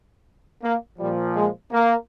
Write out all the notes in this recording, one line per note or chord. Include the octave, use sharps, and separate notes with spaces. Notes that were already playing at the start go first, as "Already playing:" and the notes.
A#3
A#2 F3 G3
G#3
A#3